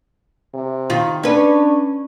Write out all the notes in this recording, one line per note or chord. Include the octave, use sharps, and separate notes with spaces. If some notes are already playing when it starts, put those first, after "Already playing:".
C3
D#3 F4
C#4 D4 B4